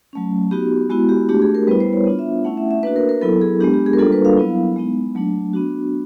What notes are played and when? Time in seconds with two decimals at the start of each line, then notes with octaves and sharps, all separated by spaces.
0.13 F#3 A3 C#4
0.51 B3 D#4 F#4 G4
0.90 G#3 B3 E4 F#4
1.09 G4
1.29 A3 D4 F#4 G4
1.42 G#4
1.55 A#4
1.67 G3 B3 E4 B4
1.80 C5
1.93 C#5
2.06 B3 D4 F4
2.19 E5
2.44 A3 C#4 E4 F#5
2.58 E5
2.71 E5
2.83 A#3 D4 F#4 B4
2.96 A#4
3.09 A#4
3.21 F#3 B3 E4 A4
3.41 G#4
3.60 G#3 B3 D4 G4
3.74 G4
3.86 G#4
3.93 A#4
3.98 G3 A#3 D4 F4 A4
4.12 B4
4.25 F5
4.38 F#3 B3 E4
4.76 G#3 B3 D#4
5.15 F#3 A3 D4
5.54 B3 D4 F#4